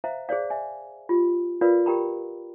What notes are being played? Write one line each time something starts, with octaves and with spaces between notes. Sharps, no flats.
C5 E5 F5 A#5
G#4 C5 D5 F5
E5 G#5
F4 G4
F4 A#4 B4 D5 F5
G4 A#4 G5 A#5 B5